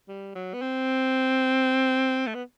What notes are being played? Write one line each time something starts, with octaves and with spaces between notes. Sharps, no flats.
G3
F#3
B3
C4
A3
B3